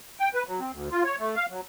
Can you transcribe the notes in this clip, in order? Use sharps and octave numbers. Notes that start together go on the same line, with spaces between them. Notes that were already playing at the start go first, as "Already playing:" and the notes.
G5
B4
F#3
C4
D2
F4
C#5
A3
F5
F#3